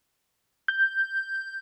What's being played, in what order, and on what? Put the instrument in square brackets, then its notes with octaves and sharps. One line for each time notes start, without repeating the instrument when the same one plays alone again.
[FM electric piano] G6